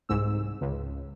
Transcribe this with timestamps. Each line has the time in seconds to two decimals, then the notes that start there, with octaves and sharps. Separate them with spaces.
0.09 C2 G#2 E6
0.61 C#2